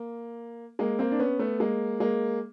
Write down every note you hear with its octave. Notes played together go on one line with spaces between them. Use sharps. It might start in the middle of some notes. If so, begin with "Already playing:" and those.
Already playing: A#3
G#3 A#3
A#3 C4
D4
B3 C#4
A3 B3
G#3 A#3
G#3 A#3